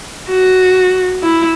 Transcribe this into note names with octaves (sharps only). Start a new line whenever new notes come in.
F#4
E4